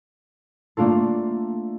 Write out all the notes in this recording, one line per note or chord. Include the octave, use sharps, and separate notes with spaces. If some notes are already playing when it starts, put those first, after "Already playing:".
A3 A#3 D4 F4 A4